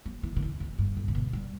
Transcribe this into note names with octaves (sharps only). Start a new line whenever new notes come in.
F#3
E3
D#3
E3
F#2
G2
A2
C3
B2
G3